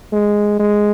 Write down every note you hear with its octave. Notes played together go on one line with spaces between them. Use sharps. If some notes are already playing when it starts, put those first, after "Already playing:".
G#3
G#3